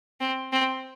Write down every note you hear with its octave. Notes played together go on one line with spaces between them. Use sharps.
C4
C4